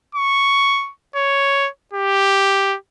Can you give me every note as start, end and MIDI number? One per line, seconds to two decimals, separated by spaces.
0.15 0.91 85
1.16 1.69 73
1.93 2.76 67